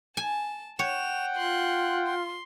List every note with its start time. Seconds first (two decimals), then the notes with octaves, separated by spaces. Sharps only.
0.17 G#5 A5
0.79 C#5 F#5 G5 E7 F7
1.35 F4 C6 F#6
2.07 C6